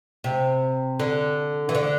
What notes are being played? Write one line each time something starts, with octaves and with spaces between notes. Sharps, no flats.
C3
D3
E3
D3